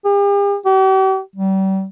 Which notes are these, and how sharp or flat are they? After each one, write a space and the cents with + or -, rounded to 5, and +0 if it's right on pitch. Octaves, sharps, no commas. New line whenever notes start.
G4 +45
G4 -45
G3 -35